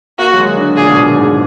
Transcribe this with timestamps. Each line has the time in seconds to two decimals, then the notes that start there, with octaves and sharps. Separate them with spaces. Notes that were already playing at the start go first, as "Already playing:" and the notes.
0.19 A#3 F#4
0.33 F#3
0.38 G#3
0.57 D3
0.76 A#2 G#4
0.89 B2
0.96 A#2
1.15 G#2